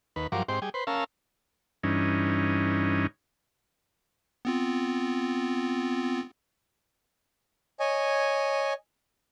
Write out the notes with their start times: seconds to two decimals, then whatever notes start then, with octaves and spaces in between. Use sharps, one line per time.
0.16 D#2 B4
0.32 G2 F3 F#3 A#4 D6
0.49 G#2 C4 G4 C5
0.62 G3 G#4
0.74 B4 C5
0.87 C#4 A#4 F5 A5 E6
1.83 G2 E3 C#4 D#4
4.45 B3 C4 F4
7.80 C#5 D#5 G#5